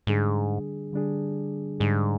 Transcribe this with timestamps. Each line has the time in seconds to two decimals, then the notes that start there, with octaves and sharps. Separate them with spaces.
0.07 G#2 D3 G3 D4 G#4
0.93 D3 G3 D4 G#4
1.80 G#2 D3 G3 D4 G#4